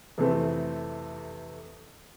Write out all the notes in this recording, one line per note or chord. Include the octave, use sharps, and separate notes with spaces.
F2 C3 E3 A3 C4